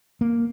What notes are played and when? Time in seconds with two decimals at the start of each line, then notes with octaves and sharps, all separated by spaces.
0.21 A#3